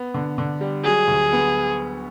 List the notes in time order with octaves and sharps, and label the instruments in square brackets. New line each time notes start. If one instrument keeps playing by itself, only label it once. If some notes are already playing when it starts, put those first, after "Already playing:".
Already playing: [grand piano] B3
D3
D3
G3
[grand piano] F#3 [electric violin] G#4
[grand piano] D2
B3